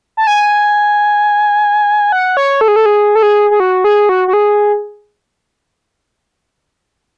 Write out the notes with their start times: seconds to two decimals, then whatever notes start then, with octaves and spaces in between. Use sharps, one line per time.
0.17 A5
0.27 G#5
2.12 F#5
2.37 C#5
2.61 A4
2.68 G#4
2.76 A4
2.86 G#4
3.15 A4
3.23 G#4
3.51 G#4
3.60 F#4
3.84 G#4
4.09 F#4
4.28 F#4
4.33 G#4